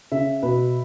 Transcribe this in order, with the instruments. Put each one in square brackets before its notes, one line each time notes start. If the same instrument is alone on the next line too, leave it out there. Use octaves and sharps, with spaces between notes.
[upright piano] C#3 [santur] E5
[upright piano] B2 [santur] B4